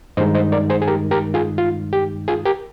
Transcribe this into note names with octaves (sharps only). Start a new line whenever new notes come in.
G2 D#3 G#3 D#4 C5 D#5
C5 D#5
A#4 D5
G#4 C5
G#4
G4 A#4
G4 A#4
F4 G#4
F4
G4
F4 G#4
G4 A#4